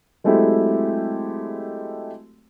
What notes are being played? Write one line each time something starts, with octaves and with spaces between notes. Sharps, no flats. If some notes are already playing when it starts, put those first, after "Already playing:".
F#3 G#3 A3 C4 E4 G4